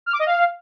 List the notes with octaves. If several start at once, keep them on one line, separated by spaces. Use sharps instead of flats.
F6
D6
D#5
F5